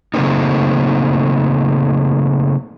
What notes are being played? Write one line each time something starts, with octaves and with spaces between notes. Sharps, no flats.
C#3 F#3 A3 A#3 C4 D#4